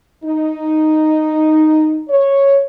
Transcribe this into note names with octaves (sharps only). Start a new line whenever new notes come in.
D#4
C#5